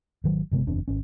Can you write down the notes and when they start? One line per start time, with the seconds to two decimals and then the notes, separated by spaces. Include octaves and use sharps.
0.24 G#1 D#3 F#3
0.51 G1 C3 G#3 B3
0.67 F#1 E2 C4 D4
0.88 G#1 C#4